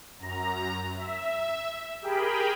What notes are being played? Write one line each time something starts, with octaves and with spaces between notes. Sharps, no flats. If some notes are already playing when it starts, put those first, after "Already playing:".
F#2 A#5
E5
G4 G#4 A#4 G5 B5